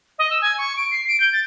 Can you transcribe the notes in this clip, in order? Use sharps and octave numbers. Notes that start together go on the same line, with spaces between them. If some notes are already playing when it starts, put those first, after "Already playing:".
D#5
E6
G#5
C#6
D7
C7
D7
G6
A6